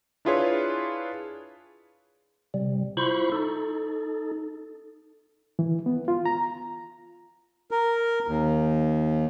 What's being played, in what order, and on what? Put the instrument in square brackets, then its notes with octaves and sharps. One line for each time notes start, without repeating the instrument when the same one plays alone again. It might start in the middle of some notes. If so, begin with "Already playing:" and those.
[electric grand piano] D4 E4 F4 G#4 B4 C#5
[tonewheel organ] C3 G3
E4 F4 C5 B5 C#6
D#4 A4
[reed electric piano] E3
B3
F4
A#5
[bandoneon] A#4
D#2